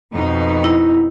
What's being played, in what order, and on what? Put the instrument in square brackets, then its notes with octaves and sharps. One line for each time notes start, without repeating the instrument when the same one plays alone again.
[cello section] F2 B2 D#4
[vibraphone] E4